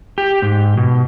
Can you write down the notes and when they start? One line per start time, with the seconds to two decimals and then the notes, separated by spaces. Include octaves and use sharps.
0.18 G4
0.42 G#2
0.77 B2